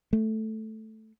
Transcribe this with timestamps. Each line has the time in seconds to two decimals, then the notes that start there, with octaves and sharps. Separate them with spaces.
0.13 A3